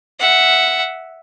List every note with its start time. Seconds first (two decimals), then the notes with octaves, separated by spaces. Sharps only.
0.20 E5 F#5